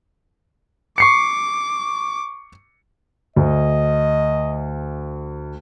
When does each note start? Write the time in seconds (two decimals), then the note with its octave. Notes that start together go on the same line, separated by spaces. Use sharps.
0.98 C#6 D6 C7 C#7
3.36 D2 D#5